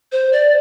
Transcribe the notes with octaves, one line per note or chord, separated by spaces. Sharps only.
C5
D5